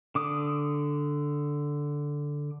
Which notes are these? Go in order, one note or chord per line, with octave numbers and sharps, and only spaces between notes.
D3 D6 D#6